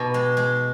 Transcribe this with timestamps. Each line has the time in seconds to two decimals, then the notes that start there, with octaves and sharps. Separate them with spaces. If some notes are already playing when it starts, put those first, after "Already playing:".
Already playing: B2 D#4 G4
0.14 G#3
0.37 G#3